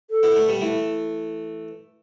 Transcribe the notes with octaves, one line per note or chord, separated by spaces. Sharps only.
A4
B3 E4
A3 D4
G3 B3
E3 A3